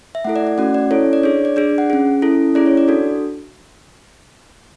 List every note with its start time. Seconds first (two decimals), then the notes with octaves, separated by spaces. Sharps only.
0.15 E5
0.24 A3 E4 A4 F#5
0.36 D5
0.47 D5
0.58 A3 C#4 F#4 F#5
0.74 D5
0.91 C#4 E4 A4 C#5
1.13 D5
1.23 D4 G#4 C#5
1.45 D5
1.56 D4 G#4 D5
1.78 F#5
1.90 C#4 G#4
2.22 C#4 E4 A4
2.55 C#4 E4 G#4 D5
2.66 C#5
2.77 D5
2.88 D4 F#4 A4